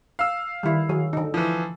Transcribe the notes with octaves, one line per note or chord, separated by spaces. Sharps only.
F5 E6
D#3 G3 E4
F#3 G#4
D3 D#4
E3 F3 E4